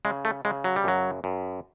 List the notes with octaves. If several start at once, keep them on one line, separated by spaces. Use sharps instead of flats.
C#3 G#3
A3
C#3 G#3
F#3
G3
F#2 F#3
F#2